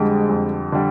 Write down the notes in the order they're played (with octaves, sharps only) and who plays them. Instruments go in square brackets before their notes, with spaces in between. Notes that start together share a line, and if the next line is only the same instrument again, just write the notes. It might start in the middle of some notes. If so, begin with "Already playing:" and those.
Already playing: [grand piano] F2 D3 G3 [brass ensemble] G#3
[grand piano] F2
D3 G3